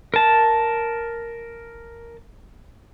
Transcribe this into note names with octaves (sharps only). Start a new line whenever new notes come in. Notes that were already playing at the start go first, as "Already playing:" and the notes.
A#4 A5